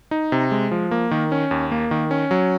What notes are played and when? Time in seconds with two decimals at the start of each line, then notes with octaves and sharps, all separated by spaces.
0.11 D#4
0.32 C3
0.52 G#3
0.71 F3
0.91 A#3
1.11 D#3
1.32 C#4
1.51 D#2
1.71 A#3
1.91 D#3
2.11 C#4
2.31 F#3